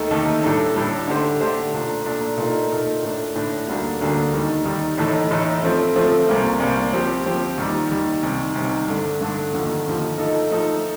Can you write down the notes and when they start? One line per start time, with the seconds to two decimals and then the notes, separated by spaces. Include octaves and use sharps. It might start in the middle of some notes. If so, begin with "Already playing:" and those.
Already playing: D#2 D#3 A3 D#4 A4
0.11 D#2 D#3 A3 D#4 A4
0.43 A2 G3 D4 A4
0.76 A2 G3 D4 A4
1.08 D3 A3 D4 G4 C5
1.40 D3 A3 D4 G4 C5
1.74 A#2 A3 D4
2.06 A#2 A3 D4
2.37 A#2 A3 D#4 A#4
2.71 A#2 A3 D#4 A#4
3.03 A2 A3 D4
3.36 A2 A3 D4
3.67 D2 D3 G3 A#3 D4
4.01 D2 D3 G3 A#3 D4
4.34 D#2 D#3 G3
4.65 D#2 D#3 G3
4.98 A1 A2 A3 D#4 A4
5.31 A1 A2 A3 D#4 A4
5.63 F3 A3 C4
5.96 F3 A3 C4
6.29 C2 C3 G3 A#3
6.60 C2 C3 G3 A#3
6.93 F3 C4 G4
7.26 F3 C4 G4
7.58 D#2 D#3 G3
7.91 D#2 D#3 G3
8.23 C2 C3 D#3
8.55 C2 C3 D#3
8.88 G2 D3 A3 D4
9.21 G2 D3 A3 D4
9.54 D#2 D3 F3
9.86 D#2 D3 F3
10.18 F3 A3 D#4 A4 D#5
10.50 F3 A3 D#4 A4 D#5